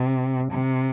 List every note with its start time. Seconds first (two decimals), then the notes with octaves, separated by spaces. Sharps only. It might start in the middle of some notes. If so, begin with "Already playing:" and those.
Already playing: C3
0.52 C3